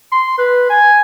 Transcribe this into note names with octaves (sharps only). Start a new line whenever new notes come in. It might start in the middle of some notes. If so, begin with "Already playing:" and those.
C6
B4
G#5